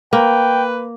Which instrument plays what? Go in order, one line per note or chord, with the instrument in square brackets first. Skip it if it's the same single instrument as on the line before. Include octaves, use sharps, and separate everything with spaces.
[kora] A#3 [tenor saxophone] B4 [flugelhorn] G5